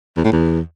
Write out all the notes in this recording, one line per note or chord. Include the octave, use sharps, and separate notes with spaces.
E2
A2
E2